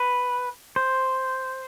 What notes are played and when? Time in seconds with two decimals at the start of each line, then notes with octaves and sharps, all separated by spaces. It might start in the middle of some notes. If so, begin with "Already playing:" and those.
Already playing: B4
0.76 C5